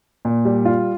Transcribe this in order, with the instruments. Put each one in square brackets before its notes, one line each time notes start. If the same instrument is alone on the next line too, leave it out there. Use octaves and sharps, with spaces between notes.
[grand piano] A#2
G3
F4